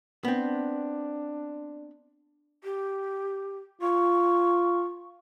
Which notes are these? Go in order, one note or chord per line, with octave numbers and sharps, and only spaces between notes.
B3 C4 D4
G4
F4 C#6